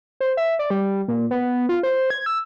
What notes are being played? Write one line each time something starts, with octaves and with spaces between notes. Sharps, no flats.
C5
E5
D5
G3
A#2
B3
F4
C5
G#6
E6